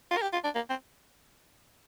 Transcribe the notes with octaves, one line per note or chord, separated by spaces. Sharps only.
F4
A#4
G4
F4
D4
A#3
C4